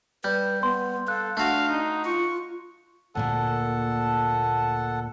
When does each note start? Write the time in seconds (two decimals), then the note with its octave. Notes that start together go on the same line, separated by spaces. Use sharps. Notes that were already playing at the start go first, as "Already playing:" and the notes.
0.24 G3 B4 G6
0.63 B3 C6
1.08 A4 F5 F#6
1.37 A3 D4 F#4 F5
1.69 D#4
2.05 F4 C#6
3.15 D2 A#2 A#3 A4 F#5 A5